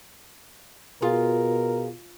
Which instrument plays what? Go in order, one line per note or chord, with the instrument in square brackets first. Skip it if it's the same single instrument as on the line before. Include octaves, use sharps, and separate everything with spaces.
[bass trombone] B2 [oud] F4 [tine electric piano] G#4 F5 [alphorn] A#4